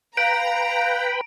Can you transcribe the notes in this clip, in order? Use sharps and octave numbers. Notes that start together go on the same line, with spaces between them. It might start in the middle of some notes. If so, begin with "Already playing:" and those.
B4 F5 G5 A#5 B5 D7